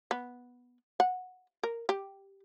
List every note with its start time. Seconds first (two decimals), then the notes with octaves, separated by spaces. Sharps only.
0.11 B3
1.00 F#5
1.63 A#4
1.89 G4